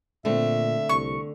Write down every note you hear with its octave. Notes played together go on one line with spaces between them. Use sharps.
A#2 D3 A3 C4 E5
C2 C#6